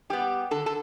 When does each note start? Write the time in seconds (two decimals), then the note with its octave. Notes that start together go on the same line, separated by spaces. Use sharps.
0.10 G3 B3 G4
0.51 D3 A4
0.66 A4